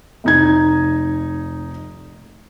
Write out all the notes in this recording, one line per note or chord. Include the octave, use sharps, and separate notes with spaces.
F1 D#4 G#6